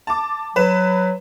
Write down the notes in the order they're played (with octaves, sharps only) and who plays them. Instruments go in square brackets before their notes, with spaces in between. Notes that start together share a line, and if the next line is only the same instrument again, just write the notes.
[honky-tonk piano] A5 D6
[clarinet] F#3 [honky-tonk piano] B4 E7